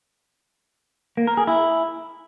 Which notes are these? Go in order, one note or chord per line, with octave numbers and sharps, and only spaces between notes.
A#3
A#4
G#4
E4